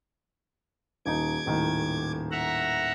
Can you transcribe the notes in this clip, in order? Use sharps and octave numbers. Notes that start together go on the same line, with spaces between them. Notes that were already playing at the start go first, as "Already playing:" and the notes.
D#1 D#4 D6 G#6
D#1 A2 D#3
E5 F#5 A#5